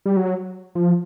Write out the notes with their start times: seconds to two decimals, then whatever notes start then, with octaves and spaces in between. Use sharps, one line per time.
0.06 G3
0.17 F#3
0.75 F3